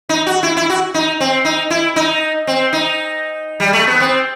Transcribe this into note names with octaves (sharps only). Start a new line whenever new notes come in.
D#4
F#4
E4
E4
F#4
D#4
C4
D#4
E4
D#4
C4
D#4
G3
A3
B3
C4